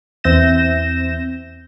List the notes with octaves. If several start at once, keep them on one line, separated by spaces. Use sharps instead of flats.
E2 C4 E5 G6 A#6 E7